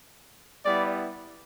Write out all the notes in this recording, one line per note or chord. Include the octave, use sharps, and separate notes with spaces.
G3 B3 E4 D5